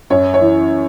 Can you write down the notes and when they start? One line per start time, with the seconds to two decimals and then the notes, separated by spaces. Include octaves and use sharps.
0.10 F#2 C#5
0.34 C#5
0.41 E3